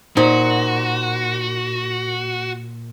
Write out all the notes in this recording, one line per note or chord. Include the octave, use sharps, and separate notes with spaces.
A#2 D#4 F#4 C5